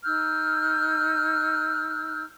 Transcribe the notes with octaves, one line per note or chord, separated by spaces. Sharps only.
D#4 E6 F6 G6